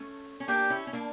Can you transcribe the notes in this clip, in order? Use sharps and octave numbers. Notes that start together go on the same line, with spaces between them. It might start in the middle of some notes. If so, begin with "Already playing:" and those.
Already playing: A3 C#4
C#4
A#3 D4 G4
C#4 E4
C#4
A#3 D4